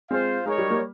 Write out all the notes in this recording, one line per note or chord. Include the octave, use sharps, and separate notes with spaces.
G#3 C4 F4 C5 F5
G#3 D#4 A#4 C#5
G3
G3 A#3